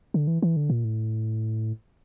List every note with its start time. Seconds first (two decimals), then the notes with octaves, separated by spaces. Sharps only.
0.14 D3
0.27 E3
0.42 E3
0.56 D3
0.70 A#2
0.84 A2